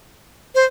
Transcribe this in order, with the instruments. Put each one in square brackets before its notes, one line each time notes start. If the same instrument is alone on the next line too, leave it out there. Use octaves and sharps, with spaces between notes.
[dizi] C5